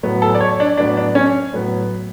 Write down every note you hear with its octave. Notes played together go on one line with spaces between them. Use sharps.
A2 F#3 B3
A4
D5
C#5
D4
A2 F#3 B3 D4
D4
C#4
A2 F#3 B3